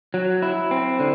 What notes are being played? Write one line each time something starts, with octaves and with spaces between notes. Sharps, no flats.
F#3
E4
C4
D3